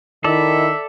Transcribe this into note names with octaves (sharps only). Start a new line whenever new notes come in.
D#3 D#4 E4 A4 D5 E5